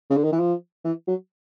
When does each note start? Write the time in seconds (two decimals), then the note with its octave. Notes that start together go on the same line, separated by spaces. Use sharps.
0.10 C#3
0.17 D3
0.24 D#3
0.32 E3
0.40 F3
0.85 E3
1.07 F#3